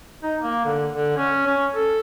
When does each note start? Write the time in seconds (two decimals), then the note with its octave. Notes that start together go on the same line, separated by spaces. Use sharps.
0.23 D#4
0.42 A#3
0.65 D3
0.93 D3
1.17 C#4
1.46 C#4
1.73 A4